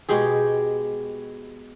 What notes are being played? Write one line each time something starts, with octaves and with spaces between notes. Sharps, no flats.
B2 G#3 G4 G#4